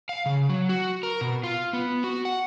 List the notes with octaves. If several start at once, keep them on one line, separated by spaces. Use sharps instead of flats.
F5
C#3
F#3
F#4
A#4
B2
F4
B3
F#4
F#5